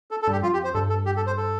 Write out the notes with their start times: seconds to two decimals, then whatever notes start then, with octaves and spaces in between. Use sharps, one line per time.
0.11 A4
0.22 A4
0.27 G2 G4
0.42 F2 F4
0.53 G4
0.64 C5
0.74 G2 A4
0.90 A4
1.06 G4
1.17 A4
1.27 C5
1.37 A4